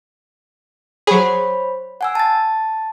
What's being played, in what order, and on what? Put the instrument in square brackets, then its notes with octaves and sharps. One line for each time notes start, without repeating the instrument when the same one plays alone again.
[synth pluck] F#3 G#4 [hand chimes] C5 C#5 B5
[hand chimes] F#5 G#5 E6
A5 A6